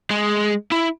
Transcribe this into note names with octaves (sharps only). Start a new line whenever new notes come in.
G#3
E4